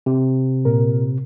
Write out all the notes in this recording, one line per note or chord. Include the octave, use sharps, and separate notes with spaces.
C3
A#2 A#4